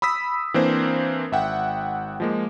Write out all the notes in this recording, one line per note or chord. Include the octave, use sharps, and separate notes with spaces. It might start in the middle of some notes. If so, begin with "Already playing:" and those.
B5 D#6 E6 B6
E3 A#3 C4 D4 A#4 C5
G#1 E5 F#5 G5
F3 G#3 A#3